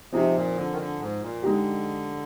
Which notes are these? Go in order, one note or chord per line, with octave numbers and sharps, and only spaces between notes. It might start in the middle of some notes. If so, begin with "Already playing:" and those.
C3 F3 C4 D#4 G#4
A#2
D3
D#3
D3
G#2
A#2
D3 G#3 D#4 G4